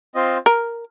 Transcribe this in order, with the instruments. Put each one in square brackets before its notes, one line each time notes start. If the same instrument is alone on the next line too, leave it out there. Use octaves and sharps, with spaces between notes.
[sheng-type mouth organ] C4 F4 C5 D#5
[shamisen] A#4